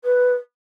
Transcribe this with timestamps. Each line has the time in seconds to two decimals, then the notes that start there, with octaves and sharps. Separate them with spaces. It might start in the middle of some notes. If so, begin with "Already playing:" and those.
0.04 B4